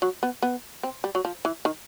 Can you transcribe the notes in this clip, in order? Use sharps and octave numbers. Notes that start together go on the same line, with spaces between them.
F#3
B3
B3
C4
G3
F#3
F3
E3
D#3